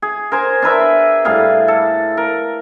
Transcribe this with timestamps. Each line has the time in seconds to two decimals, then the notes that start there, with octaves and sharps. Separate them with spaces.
0.02 G#4
0.32 A#4 C5 G#5 A#5
0.62 D4 A#4 B4 E5
1.25 A2 G3 G#4 F5
1.68 A4
2.17 A#4